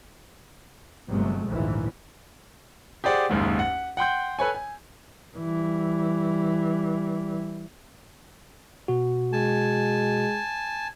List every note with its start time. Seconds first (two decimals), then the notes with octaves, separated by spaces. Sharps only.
1.09 G1 C3 F#3 G#3 A3
1.47 A#1 D#2 G#2 E3
3.04 G4 G#4 C5 D5 F#5
3.29 F#1 D#2 G#2
3.59 F#5
3.97 F#5 G5 C6 G6
4.39 A4 B4 C#5 G#5
4.55 G#5
5.37 E3 G3
8.88 B2 F#4
9.33 G#3 G#5 A5